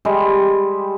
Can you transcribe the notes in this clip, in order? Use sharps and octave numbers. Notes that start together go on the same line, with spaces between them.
G3 G#3 G4